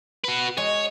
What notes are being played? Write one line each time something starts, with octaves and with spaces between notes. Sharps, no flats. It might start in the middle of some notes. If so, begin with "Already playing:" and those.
F#4 B4
G#3 C#5